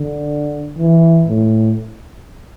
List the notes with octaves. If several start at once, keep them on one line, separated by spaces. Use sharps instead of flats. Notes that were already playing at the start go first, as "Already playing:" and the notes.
Already playing: D3
E3
A2